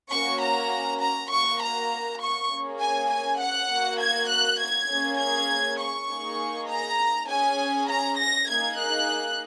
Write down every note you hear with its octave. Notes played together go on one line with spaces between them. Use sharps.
A#3 C#4 F#4 C#6
A#5
A#5
A#3 F#4 C#6
A#5
C#6
A#3 C#4 G#4
G#5
G#5
F#5
A#3 F#4
G#6
F#6
G#6
A#3 C#4 G#4
G#6
C#6
A#3 D#4 G#4
A#5
C#4 G#4 G#5
A#5
A#6
A#3 D#4 G#4 G#6
F#6